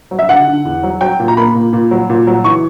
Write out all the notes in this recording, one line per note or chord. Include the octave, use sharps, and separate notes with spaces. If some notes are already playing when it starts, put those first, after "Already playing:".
F#3
E5
D3 F#5
D3
E2
F#3
F#3 G5
A#2
A#5
A#3 B5
A#2
A#2
F#3
A#2
F#3
E3 C#6